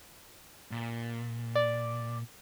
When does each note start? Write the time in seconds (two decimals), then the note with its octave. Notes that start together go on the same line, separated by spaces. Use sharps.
0.71 A#2
1.55 D5